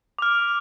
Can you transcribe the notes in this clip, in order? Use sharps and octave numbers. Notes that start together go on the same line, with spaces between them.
D6 F6